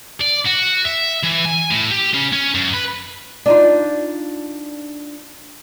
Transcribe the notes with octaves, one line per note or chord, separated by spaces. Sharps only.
D5
F#4
E5
E3
G#5
A2
G4
C#3
C#4
F#2
B4
D4 D#4 F4